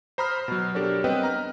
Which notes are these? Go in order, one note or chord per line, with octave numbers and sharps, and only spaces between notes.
C5 A#5 B5 D#6 F6
B2 F#3
D4 G4 A4 A#4 C#5
G3 B3 C4 B4 D#5 G5
A#5 F6